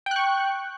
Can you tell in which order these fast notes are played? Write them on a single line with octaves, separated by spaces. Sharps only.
G5 F#6 C#6